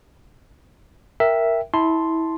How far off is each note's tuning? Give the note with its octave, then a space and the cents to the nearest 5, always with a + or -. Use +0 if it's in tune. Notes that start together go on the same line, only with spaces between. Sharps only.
A#4 +0 E5 +0 G5 +0
E4 -25 A5 +0 C6 +0